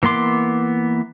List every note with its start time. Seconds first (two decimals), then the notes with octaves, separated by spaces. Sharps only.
0.03 E3 A#3 B3 C6 D6